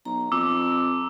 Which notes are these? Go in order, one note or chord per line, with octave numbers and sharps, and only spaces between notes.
B1 A#5
F2 D6 E6